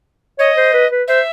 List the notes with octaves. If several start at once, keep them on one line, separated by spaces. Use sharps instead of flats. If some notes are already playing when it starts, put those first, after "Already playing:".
C#5 D#5
C5
B4
B4
C5 E5